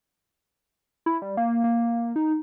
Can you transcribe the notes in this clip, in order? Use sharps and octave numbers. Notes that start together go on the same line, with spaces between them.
E4
G3
A#3
A#3
D#4